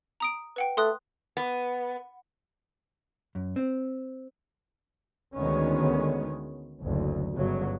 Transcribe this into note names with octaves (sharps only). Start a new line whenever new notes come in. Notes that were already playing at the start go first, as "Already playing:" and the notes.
A#5 D#6 D7
B4 F#5 G5
A3 C6 D#6 F#6
B3
F#2
C4
D2 D#3 G#3 B3 C#4
F#1 D2
G1 C#3 F#3